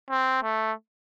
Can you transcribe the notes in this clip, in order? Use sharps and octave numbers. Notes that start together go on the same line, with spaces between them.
C4
A3